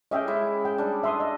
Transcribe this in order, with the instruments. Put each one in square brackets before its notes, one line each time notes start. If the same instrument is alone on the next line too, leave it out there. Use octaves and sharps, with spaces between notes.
[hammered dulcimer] C#4 G4 G#4 [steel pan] D#5 E5 G5
[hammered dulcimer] G#3 E4
[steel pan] G5
[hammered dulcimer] G3 D4
[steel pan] E5 C6 D#6
D#5